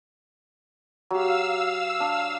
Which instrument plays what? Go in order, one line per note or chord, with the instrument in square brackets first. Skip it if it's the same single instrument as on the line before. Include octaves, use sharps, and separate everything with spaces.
[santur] F#3 G4 [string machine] F5 E6
[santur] D4